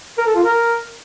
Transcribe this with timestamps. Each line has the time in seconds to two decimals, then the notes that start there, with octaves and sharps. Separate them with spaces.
0.18 A#4
0.26 A4
0.35 F4
0.44 A#4